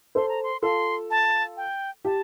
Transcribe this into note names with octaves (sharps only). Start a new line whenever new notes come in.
A4 C5 C6
A#5
C6
F4 A4 C6
A5
G5
G4 A5